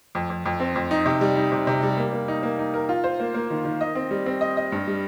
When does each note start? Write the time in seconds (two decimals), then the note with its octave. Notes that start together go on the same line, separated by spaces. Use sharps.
0.15 F2
0.30 F2
0.46 F2
0.60 C4
0.76 F2
0.91 D#4
1.06 C3
1.21 G3
1.37 D#4
1.52 C3
1.67 C3
1.83 G3
1.97 A#3
2.13 A#3
2.28 D#4
2.43 A#3
2.59 D#4
2.74 A#4
2.89 F4
3.04 C5
3.20 A#3
3.34 A#3
3.50 D#3
3.65 D#3
3.81 D#5
3.95 C4
4.11 G3
4.26 C4
4.41 D#5
4.57 D#5
4.72 G2
4.87 G3